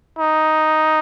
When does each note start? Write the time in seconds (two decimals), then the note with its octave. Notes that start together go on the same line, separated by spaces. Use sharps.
0.19 D#4